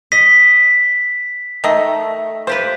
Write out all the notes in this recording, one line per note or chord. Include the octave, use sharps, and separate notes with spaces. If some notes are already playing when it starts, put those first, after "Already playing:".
D#5 B6
D#3 A3 D#5
F4 G4 B4 C5